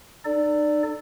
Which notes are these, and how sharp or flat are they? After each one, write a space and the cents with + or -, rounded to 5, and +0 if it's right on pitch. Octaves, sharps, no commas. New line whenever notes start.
D#4 -40 A4 +0 D5 +0